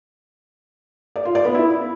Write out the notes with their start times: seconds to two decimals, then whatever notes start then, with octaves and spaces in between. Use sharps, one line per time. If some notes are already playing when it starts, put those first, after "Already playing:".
1.16 D5
1.25 F4
1.35 D5
1.45 B3
1.54 E4